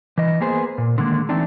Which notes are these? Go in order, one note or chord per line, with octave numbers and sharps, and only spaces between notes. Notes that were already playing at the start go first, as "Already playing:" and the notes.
E3 D#5
A#3 B3 G#4 C5
A#2
D3 D#3 G#3 A#3
E3 A3 C4 D4 D#4